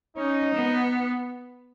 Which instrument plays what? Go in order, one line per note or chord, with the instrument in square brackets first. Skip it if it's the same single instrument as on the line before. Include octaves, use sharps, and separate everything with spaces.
[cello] C#4 [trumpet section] D#4
[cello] B3